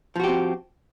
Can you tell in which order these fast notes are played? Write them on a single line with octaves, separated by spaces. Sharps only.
F3 F#4 G4 C4